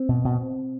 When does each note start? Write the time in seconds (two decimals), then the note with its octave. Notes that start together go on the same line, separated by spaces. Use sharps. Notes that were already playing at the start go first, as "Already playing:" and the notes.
Already playing: C4
0.09 B2
0.25 B2